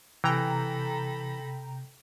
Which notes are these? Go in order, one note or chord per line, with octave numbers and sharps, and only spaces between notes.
C3 E3 A4 G5 A#5 B5 A#6